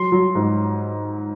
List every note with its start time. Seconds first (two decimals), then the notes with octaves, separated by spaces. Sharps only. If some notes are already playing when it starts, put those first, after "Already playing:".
Already playing: F#3 C6
0.12 F#3
0.35 G#2